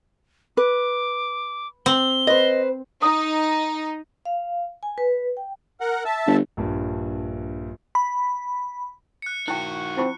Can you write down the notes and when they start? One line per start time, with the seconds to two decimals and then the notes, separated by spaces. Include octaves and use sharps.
0.57 B4 D6
1.86 C4 G7
2.27 B4 C5 D#5
3.02 D#4 D#6
4.25 F5
4.83 G#5
4.98 B4
5.37 G5
5.81 A#4 F#5
6.05 E5 A5
6.27 G1
6.57 A#1 G2
7.95 B5
9.22 F#6 C#7
9.48 D#3 E4 F#4 G5 F#6
9.98 C4 E4 F4 C#6